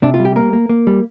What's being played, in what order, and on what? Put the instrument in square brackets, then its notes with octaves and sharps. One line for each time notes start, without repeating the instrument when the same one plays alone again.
[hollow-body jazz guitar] C3 D4
F4
G3
G4
A#3 A#4
A#3
A#3
G3